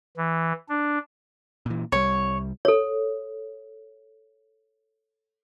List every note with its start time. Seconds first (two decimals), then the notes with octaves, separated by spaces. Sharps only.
0.17 E3
0.69 D4
1.66 A#2 E3
1.92 C2 G3 C#5
2.65 A4 C#5